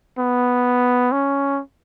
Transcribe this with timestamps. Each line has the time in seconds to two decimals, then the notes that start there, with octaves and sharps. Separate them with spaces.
0.19 B3
1.12 C#4